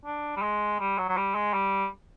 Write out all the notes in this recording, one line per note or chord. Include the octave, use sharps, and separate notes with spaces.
D4
G3
G#3
G3
F#3
F#3
G3
G#3
G3